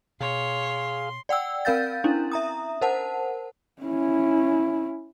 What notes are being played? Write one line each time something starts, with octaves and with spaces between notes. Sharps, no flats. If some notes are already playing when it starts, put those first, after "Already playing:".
B2 G#4 C#5 F5 C6
D5 F#5 G5 E6
C4 A#4 F5 G6 A6
C#4 D4 E4
E5 A#5 D#6
A#4 C5 F#5 A5
C#4 E4